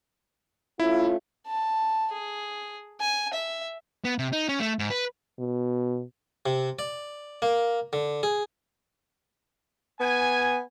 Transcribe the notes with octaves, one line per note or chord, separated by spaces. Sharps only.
A3 C#4 E4 F4
A5
G#4
G#5
E5
B3
C3
D#4
C#4
A3
G#2
B4
B2
C3
D5
A#3
D3
G#4
B3 G#5